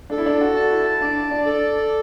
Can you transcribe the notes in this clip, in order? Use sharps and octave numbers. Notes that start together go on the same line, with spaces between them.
D4 A4
E4
D4
F#4
A5
E4
D4 D5
D4
A4